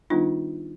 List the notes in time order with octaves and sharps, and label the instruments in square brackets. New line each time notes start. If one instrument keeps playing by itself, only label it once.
[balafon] D#3 G3 B3 D4 D#4 F4